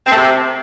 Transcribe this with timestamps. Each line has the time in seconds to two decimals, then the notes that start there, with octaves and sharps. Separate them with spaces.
0.05 C4
0.10 A3
0.16 C3